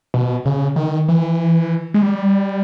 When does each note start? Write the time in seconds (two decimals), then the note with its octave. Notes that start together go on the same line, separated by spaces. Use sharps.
0.14 B2
0.45 C#3
0.76 D#3
1.08 E3
1.94 G#3
2.02 G3